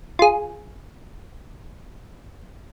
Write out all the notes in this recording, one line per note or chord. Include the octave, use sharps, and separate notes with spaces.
F4 G#4